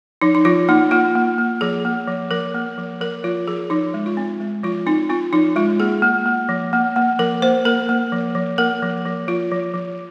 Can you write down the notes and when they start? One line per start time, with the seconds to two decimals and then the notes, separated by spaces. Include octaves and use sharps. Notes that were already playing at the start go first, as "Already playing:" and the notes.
0.21 F3 D#4
0.35 D#4
0.45 F3 F4
0.69 A#3 D#4
0.91 A#3 F4
1.15 A#3
1.38 A#3
1.61 F3 G#4
1.85 A#3
2.08 F3
2.31 F3 A#4
2.54 A#3
2.78 F3
3.01 F3 A#4
3.24 F3 F4
3.48 F3 G#4
3.70 F3 D#4
3.94 G#3
4.06 F4
4.17 C4
4.40 G#3
4.63 F3 F4
4.86 C4 D#4
5.09 C4 F4
5.33 F3 D#4
5.56 G#3 F4
5.80 A#3 G#4
6.02 A#3
6.26 A#3
6.49 F3
6.73 A#3
6.96 A#3
7.19 F3 A#4
7.42 A#3 C5
7.65 A#3 A#4
7.89 A#3
8.12 F3
8.35 F3
8.58 A#3 A#4
8.82 F3
9.05 F3
9.28 F3 F4
9.51 F3
9.74 F3